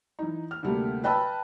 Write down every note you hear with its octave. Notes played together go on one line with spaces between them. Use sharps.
E3 D#4
F6
D2 C3 G3 A3 A#3
B4 D#5 G5 A5 B5 E6